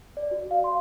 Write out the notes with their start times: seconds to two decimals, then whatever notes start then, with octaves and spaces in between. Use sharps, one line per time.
0.17 D5
0.31 F#4
0.51 F5
0.64 C6